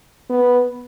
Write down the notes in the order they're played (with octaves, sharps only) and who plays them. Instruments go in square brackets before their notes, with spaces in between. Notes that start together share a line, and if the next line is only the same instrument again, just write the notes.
[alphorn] B3